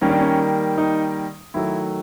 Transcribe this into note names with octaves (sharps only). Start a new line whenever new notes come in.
D#3 G3 A#3 C#4
D4
C#4
D#4
D#3 F#3 A3 E4